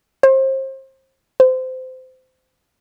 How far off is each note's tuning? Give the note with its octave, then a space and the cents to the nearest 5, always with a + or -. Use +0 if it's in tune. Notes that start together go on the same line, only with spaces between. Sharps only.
C5 +30
C5 -25